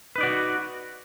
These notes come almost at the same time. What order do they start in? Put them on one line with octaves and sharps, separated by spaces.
B4 D#4 D5 F#4